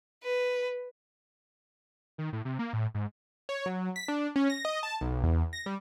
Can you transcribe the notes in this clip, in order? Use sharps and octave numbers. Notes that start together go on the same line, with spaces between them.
B4
D#3
A2
C3
A#3
A2
G#2
C#5
F#3
B6
D4
C#4
A#6
D#5
A5
B1
E2
A#6
G3